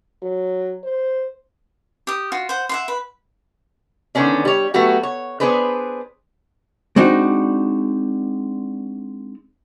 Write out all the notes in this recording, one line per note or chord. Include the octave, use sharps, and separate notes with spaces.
F#3
C5
G4 D#6
F4 F#4
C5 F#5
E5 F#5 C6
B4
D3 D#3 B3 C#4 D4
G3 C#5
F#3 A3 B3 F#4 G4
C#5
B3 D4 G#4 B4 C5
G#3 C4 D4 D#4 F#4